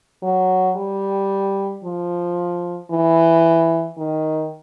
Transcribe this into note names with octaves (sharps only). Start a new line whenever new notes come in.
F#3
G3
F3
E3
D#3